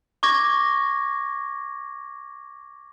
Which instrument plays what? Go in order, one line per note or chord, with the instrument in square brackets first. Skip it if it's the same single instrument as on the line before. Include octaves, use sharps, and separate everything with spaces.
[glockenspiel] C#6 D6 G#6 A#6